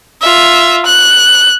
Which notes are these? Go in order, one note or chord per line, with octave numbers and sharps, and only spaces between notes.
F4 E5
F#6